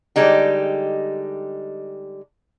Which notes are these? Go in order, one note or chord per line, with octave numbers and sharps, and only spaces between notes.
D3 G3 G#3 D#4 G4